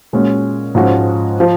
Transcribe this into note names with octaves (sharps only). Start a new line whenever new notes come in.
A#2 G#3 C#4 F#4
G#2 F3 G#3 C#4 F#4
F3